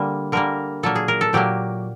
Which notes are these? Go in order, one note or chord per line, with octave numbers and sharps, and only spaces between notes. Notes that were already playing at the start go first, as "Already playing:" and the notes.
Already playing: D3 G3 A#3
D3 G3 A#3 A#4
A#2 F#3 A#3 A4
G#4
A#4
A4
A#2 F#3 A#3 G4